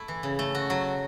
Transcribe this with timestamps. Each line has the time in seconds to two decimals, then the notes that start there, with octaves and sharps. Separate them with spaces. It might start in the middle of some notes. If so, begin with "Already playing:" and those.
Already playing: A3 E4
0.08 E3
0.23 C#3
0.39 A3
0.55 F#4
0.70 F#3